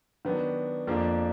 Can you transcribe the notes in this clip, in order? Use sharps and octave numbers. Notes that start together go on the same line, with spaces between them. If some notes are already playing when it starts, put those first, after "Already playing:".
D#3 F#3 B3 D4
F2 F3 A#3 D4 G#4